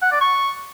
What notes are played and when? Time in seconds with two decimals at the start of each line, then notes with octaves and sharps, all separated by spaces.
0.02 F#5
0.12 D5
0.21 C#6